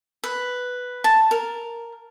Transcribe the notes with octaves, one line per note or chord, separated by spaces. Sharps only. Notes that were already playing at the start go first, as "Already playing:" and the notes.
B4
A5
A#4